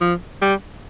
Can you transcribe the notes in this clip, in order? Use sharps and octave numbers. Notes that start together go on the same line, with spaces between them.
F3
G3